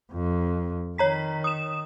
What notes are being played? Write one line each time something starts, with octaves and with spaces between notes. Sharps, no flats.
F2
D#3 C#5 A#5 B6
D#6 E7